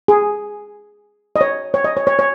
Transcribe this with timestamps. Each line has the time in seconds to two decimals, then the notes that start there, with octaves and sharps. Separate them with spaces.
0.08 G#4
1.36 D#5
1.41 C#5
1.74 C#5
1.84 D#5
1.97 C#5
2.07 C#5
2.19 C#5